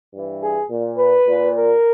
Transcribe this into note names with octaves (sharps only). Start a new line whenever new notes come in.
G2 E3
G#4
A#2
B4
A#2
A#4